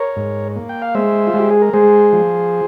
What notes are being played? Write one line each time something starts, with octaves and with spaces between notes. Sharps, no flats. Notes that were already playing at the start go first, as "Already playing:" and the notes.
Already playing: A#4 C#5
G#2
A#3
G5
F5
G#3 C5 E5
F4
G#3 G4
G#4
A#4
G#3 G#4 C5
F3